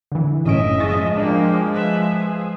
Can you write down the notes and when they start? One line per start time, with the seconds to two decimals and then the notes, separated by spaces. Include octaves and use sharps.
0.12 D3 E3
0.46 F#1 A2 C#4 D#5 E5 D7
0.80 F3 G#3 C#6 A6 A#6
1.17 A#3 D4 G5
1.73 B4 E5
2.14 G#4